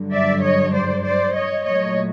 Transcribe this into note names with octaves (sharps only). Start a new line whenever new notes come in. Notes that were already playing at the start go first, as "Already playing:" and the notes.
Already playing: G2 D3 F#3
D5 E5
C#5 D#5
C5 D5
C5 D5
C#5 D#5
A#2 F#3 A3 C#5 D#5